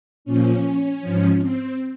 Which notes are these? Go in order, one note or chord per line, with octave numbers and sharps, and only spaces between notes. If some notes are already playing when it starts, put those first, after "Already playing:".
A#2 F3 C#4
G#2 F3
C4